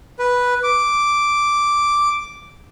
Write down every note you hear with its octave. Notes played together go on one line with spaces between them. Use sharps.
B4
D6